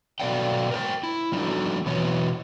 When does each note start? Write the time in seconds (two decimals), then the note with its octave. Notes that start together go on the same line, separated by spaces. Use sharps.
0.20 B2 F#3 A4 D5 F5 G5
0.71 A#4 C5 G5
1.03 E4
1.32 F3 G3 D4 D#4 F#4 A4
1.86 B2 E3 F#3 E4 C#5